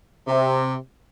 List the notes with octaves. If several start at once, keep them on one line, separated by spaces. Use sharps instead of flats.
C3